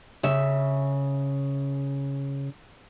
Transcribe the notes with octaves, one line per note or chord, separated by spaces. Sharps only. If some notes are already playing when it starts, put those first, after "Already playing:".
C#3 E5